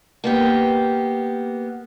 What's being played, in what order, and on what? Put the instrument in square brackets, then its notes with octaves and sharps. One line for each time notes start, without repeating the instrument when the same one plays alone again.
[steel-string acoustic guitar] A#3 B3 G4